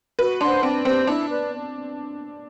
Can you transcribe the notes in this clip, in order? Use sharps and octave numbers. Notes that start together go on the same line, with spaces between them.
F#4 B4
D4 C5 F#5 C6
C4 D4
C4 G4 C5
D4 E4
B4 D5